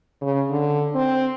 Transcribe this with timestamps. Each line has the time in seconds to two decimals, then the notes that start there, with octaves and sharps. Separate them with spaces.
0.21 C#3
0.50 D3
0.95 C4